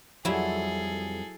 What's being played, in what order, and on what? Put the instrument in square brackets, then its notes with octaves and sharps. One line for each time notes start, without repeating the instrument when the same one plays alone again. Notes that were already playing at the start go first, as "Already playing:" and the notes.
[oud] F2 G3 [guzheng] F#3 E4 [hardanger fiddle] G#4 A4